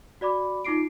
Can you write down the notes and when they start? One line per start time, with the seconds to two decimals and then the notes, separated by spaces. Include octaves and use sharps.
0.21 F#4 D5 B5 D6
0.65 D#4 F4 D6 C7 D7